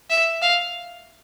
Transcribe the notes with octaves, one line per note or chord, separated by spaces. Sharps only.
E5
F5